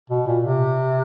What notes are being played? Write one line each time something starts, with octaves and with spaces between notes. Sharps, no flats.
B2
A#2
C3